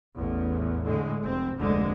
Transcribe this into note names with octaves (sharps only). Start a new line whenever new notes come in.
A1 E2
A2 D3 G#3
F1 C4
F1 D2 A#2 D3 G#3